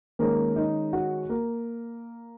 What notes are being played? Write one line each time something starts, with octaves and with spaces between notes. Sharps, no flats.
D#3 G#3 A#3 C#4 A#4
D#4 D#5
F#4 F#5
A#3 A#4